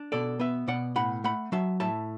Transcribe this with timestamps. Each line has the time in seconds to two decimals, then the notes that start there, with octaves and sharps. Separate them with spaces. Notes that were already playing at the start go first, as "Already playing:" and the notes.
Already playing: D4
0.12 B2 A4 D5
0.39 B3 B4 E5
0.68 B2 D5 F#5
0.96 A2 F#5 B5
1.24 A3 F#5 B5
1.52 F#3 E5 A5
1.80 A2 E5 A5